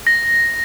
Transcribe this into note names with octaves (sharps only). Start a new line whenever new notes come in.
A#6